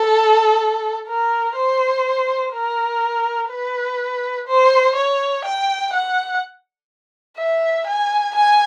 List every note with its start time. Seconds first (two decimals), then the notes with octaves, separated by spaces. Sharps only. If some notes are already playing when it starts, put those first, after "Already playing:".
Already playing: A4
1.08 A#4
1.57 C5
2.54 A#4
3.51 B4
4.47 C5
4.96 C#5
5.45 G5
5.93 F#5
7.38 E5
7.87 G#5
8.35 G#5